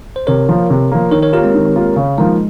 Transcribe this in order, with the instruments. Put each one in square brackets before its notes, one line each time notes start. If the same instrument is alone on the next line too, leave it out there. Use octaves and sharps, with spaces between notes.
[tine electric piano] C5
[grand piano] C3 [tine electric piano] A#4 C#5
[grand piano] F3 A#3
C3
F3 A#3
[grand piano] D#3 [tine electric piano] A#4 C#5
[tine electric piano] A#4 C#5
[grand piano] A#3 F4 [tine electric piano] G4 A#4
[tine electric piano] G#3 C4
[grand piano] D#3
A#3 F4
C#3
[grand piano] F3 A#3 D#4 [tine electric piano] G#3